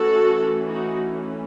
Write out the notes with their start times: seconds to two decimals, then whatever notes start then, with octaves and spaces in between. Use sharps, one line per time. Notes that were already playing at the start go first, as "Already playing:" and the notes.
Already playing: E3 A3 C#4 F#4 A4
0.66 D#4 F#4